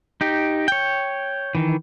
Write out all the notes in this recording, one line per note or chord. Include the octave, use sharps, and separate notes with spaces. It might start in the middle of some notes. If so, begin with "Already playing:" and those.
D#4 G4
C#5 G5
D#3 E3